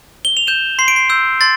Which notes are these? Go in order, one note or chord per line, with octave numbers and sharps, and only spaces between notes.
G7
F7
G6 E7
C6 C7
D7
C7
E6 G6
C6 A6